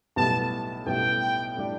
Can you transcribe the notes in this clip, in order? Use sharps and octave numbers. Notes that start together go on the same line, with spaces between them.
B1 A2 G3 B3 A5
B1 A2 G3 B3 G5
A2 G3 D4 G4